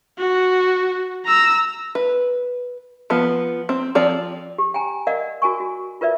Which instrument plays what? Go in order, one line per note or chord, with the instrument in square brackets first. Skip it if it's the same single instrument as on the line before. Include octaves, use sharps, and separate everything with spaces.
[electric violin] F#4
A#5 E6
[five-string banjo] B4
F3 B3
C4
F3 C4 D5
[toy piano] G4
G5 G#5 A#5
A#4 D5 D#5 F5 F#5
F#4 A#4 G#5 C#6
F#4
F4 A#4 B4 D5 E5